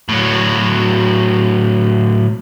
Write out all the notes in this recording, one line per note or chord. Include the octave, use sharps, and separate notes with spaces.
A2 F#3